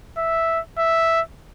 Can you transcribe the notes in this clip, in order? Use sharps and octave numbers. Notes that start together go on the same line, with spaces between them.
E5
E5